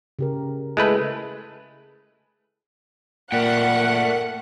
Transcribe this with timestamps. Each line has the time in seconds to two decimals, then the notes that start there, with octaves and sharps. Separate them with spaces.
0.19 C#3 G4 A#4
0.77 G#3 A3 E4 G#4 B4
3.32 A#2 A3 A#4 D5 F#5 G5